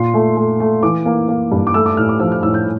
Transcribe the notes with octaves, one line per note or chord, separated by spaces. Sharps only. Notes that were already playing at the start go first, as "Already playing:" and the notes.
Already playing: A#2 C6
A3
A3
A3
E3 D6
A#3
A#3
G2
D6
A3 E6
D6
A2 F6
D6
F3 E6
F6
A2 E6
G6